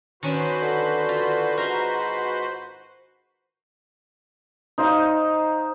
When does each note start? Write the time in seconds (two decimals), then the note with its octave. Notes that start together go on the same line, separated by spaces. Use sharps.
0.23 D#3 C#4 D4 F#4 B4 C5
0.61 D3
1.09 F4
1.58 G#2 A#4 F5 C6
4.78 D#4 C5 F5